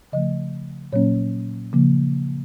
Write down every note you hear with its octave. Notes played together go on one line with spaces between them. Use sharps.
C#3 F3 A3 D#5
A#2 F#3 A#3 C#4 C#5
C#3 F3 A#3